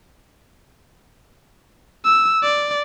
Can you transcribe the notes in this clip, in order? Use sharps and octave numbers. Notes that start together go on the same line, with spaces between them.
E6
D5